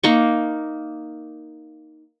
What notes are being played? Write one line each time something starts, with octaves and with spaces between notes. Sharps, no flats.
A#3 D#4 C#6